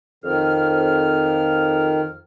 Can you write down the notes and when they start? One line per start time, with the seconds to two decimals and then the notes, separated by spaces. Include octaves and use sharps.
0.24 F2 D#3 F6